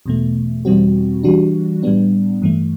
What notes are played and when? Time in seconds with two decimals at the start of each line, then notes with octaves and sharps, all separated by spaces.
0.06 E2 B2 A3
0.65 E2 B2 G3 C4 F#4
1.23 E3 G3 D4 F#4
1.83 A2 G3 B3 D4
2.42 G2 E3 A3